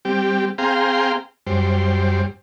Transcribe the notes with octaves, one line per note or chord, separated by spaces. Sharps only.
G3 C4 G4
C4 G#4 F5 G5 A#5 C6
F#2 G3 C5